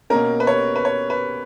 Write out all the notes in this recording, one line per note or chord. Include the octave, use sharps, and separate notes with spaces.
B2 A#3 C#4 A#4
B4
C#5
B4
C#5
B4